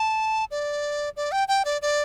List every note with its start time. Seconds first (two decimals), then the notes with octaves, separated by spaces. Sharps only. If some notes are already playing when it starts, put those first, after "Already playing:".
Already playing: A5
0.51 D5
1.16 D5
1.32 G5
1.48 G5
1.65 D5
1.82 D5